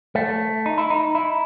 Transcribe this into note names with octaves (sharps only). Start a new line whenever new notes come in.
A3
D#4
E4
D#4
E4